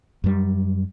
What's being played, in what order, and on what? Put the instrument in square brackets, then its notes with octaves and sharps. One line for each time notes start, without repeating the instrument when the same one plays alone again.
[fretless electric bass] F#2 G3